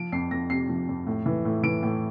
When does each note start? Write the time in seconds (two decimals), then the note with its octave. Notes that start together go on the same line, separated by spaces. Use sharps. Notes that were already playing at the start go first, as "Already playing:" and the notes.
Already playing: F3 D7
0.12 F2 C7
0.31 F2 A#6
0.50 C3 C7
0.69 F3
0.88 F2
1.07 A2
1.26 E3
1.45 A2
1.63 E3 D7
1.83 A2